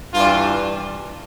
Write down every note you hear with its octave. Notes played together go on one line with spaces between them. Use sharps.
G2 E3 G3 F4